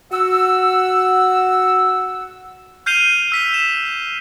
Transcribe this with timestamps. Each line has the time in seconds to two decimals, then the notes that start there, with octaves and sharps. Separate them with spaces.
0.11 F#4 F#5 E6
2.86 F6 G6 C7 D#7 F7 G7
3.32 E6 B6 G7
3.54 E7